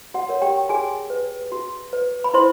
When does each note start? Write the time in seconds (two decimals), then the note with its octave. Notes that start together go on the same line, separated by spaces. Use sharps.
0.14 F#4 F#5
0.29 A#4 C#5
0.42 G4 G5
0.69 F#4 G#4 G#5
1.10 B4
1.52 F#4
1.93 B4
2.24 B5
2.34 E4 C5 C6